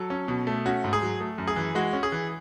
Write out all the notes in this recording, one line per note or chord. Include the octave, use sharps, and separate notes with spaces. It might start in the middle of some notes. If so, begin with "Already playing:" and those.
Already playing: F#3 A4
C#4
B2
A3
C#4 F#4
G#2
G#4
F#3
A3
F#2
G#4
E3
G#3 F#4
C#4
G#4
E3